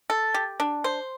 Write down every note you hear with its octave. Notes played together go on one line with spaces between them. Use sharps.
A4
G4
D4
C5